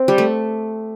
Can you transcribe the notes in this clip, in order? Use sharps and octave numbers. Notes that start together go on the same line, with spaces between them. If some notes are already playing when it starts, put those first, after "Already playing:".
Already playing: C4
G3
A3